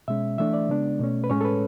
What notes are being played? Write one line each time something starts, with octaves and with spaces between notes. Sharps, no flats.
B2 G#3 C#4 E5
E3 A3 D4 E5
D5
C#3 G#3 B3 D4
B2 A3 C#4
B4
A2 G#3 C#4 C#5
A4
B4